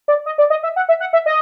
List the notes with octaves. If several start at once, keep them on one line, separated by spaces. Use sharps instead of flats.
D5
D#5
D5
D#5
E5
F#5
E5
F#5
E5
D#5